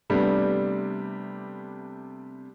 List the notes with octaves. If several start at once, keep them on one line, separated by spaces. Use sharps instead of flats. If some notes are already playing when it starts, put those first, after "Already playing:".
C3 G3 A3 B3 D4